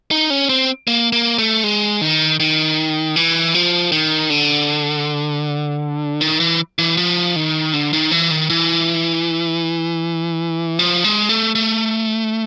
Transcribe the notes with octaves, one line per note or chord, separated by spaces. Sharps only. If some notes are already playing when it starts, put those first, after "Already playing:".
D#4
C#4
C4
A#3
A#3
A3
G#3
D#3
D#3
E3
F3
D#3
D3
D#3
E3
E3
F3
D#3
D3
D#3
E3
D#3
E3
F3
G#3
A3
A3